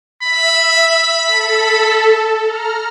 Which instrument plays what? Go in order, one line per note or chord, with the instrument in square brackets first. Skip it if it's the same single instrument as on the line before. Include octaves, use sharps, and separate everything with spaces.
[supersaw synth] E5 [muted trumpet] B5
[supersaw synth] A4
A#5 F6